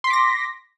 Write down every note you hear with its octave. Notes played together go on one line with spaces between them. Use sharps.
C6 D6 A#6 B6